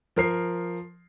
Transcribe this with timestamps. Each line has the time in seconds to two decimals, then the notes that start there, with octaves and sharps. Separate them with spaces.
0.16 F3 A#4 C7